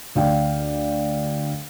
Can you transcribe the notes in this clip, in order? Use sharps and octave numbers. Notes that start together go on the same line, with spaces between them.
D2 D5 F5 G5